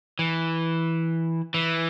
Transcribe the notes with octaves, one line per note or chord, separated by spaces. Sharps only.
E3
E3